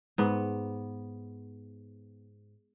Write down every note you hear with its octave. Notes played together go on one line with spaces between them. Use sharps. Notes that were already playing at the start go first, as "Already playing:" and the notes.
G#2 B3